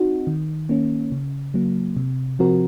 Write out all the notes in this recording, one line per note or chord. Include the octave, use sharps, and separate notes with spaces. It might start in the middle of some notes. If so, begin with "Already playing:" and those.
Already playing: C4 D#4 F#4
D#3
A#3 C#4
C#3
F#3 A#3
C3
F3 C4 F#4 A#4